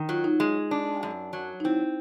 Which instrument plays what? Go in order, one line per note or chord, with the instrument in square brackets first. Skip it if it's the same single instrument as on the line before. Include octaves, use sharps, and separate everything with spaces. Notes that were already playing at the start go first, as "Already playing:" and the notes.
Already playing: [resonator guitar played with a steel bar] D#3
[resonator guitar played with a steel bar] F#3 [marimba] F4
[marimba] D#4
[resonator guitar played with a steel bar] G#3
D4
F#2
F#3
[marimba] D#4
[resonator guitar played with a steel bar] C4 [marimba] E4